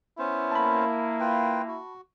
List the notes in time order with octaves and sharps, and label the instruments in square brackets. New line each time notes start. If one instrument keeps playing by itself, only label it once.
[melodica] B3 C#4 C5 [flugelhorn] E4
[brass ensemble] A#3 [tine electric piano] A5 B5
[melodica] F4 B4 G5
F#4